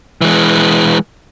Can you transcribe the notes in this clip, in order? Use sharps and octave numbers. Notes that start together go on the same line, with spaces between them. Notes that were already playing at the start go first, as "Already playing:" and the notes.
E3 G#3